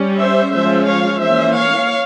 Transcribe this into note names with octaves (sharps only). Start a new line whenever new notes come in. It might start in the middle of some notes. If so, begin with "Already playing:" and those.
Already playing: G3 C#4
C5 E5
F3 G#3 C#4 C5 E5
C#5 F5
E3 A#3 C#4 C5 E5
C#5 F5